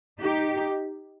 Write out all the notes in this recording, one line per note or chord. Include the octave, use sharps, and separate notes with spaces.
D#4 G4